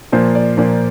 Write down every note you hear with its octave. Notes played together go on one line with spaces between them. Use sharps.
A#2 F3 A#3 C5
D5
A#2 F3 A#3